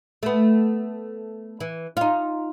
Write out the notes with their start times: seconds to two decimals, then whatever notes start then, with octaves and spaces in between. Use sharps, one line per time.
0.23 A3 B3
1.60 E3
1.97 D#4 F4